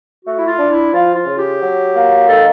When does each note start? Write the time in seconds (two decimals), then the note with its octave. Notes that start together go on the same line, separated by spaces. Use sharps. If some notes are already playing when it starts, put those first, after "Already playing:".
0.25 A3 F#4
0.38 E4
0.47 F4
0.59 D4
0.71 E4
0.93 F3 F4
1.15 F4
1.26 C#3
1.38 G4
1.61 F#3
1.94 A#3
2.28 D#3 A4